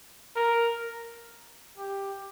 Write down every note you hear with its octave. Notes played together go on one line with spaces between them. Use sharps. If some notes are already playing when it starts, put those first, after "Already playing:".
A#4
G4